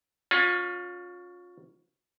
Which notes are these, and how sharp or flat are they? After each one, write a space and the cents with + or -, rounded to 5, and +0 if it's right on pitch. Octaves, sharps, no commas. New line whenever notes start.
C#4 +5 F4 +30